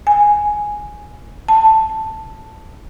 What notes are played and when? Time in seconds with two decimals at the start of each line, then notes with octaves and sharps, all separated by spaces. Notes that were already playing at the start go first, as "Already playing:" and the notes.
0.07 G#5
1.48 A5